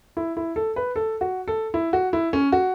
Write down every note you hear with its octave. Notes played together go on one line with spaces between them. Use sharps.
E4
E4
A4
B4
A4
F#4
A4
E4
F#4
E4
C#4
F#4